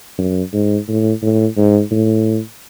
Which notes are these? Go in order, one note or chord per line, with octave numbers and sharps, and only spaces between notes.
F#2
G#2
A2
A2
G#2
A2